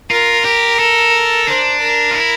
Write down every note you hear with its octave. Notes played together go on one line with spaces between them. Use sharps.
F4 A#4
G4
A4
D4 C5
A#4
F4
E4